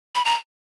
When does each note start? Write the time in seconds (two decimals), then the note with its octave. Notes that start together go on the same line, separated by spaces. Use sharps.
0.15 B5
0.25 A#5